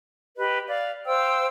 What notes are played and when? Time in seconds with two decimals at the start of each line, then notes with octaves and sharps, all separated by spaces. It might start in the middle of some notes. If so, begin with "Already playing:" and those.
0.37 G4 B4 D#5
0.67 D5 F5
1.06 C5 F5 G5 E6